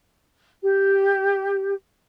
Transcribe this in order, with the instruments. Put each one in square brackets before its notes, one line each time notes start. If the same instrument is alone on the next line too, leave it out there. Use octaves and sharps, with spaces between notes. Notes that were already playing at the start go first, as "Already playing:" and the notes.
[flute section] G4